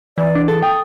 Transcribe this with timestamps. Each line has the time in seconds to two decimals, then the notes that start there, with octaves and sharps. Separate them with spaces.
0.18 E3 D5
0.35 D4
0.48 G#4 A4
0.62 G5 D#6